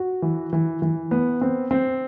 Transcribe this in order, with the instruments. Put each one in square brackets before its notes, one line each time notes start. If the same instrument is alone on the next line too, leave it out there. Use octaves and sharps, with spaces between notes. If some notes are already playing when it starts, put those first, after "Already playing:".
Already playing: [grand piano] F#4
E3
E3
E3
B3
C4
C4